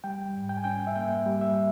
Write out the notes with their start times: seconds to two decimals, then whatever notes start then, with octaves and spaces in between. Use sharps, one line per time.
0.04 G3 G5
0.35 G#2
0.49 G5
0.57 G#5
0.64 C#4 G5
0.87 E5
0.96 A#3 G5
1.26 G3
1.41 E5